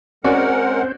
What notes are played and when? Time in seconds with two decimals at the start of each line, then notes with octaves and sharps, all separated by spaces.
0.24 G#3 C4 C#4 F#4 A#4 C5 D5 F#5